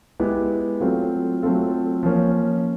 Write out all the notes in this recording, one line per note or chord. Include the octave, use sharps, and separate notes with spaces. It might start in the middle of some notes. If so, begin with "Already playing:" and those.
G#3 B3 E4 G4
F#3 A3 C4 F4 A4
F#3 A3 C4 F4 A4
F3 A#3 C#4